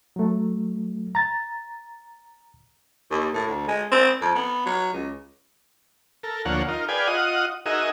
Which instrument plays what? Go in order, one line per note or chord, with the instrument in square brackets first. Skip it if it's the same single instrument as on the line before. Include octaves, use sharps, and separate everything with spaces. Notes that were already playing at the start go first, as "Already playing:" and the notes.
[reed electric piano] F#3 A3
A#5 A6
[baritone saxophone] D#2
A2
D2
G#3
C4
F2
B3
F#3
C#2
[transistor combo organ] A4 A#4
D2 F3 A#3 C#5 F#5
D#4 F4 A#4
G#4 B4 D5 F5 G5 G#5
F4 D#5 F#5 D#6
D#4 F#4 G#4 A#4 D#5 E5